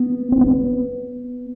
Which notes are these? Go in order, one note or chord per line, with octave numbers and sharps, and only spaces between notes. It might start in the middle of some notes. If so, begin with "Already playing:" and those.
Already playing: B3
C4
B3